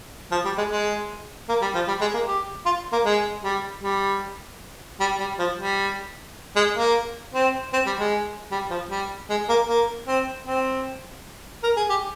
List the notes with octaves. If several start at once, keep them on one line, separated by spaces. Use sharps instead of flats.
F3
G3
G#3
G#3
A#3
G3
F3
G3
G#3
A#3
G4
F4
A#3
G#3
G3
G3
G3
G3
F3
G3
G#3
A#3
C4
C4
G3
G#3
G3
F3
G3
G#3
A#3
A#3
C4
C4
A#4
G#4
G4